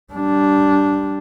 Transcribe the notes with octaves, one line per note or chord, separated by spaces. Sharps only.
G3 D4